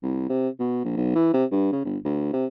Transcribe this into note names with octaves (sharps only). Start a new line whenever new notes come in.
C2
C3
B2
A#1
B1
E3
C3
G2
C#3
G1
D2
C3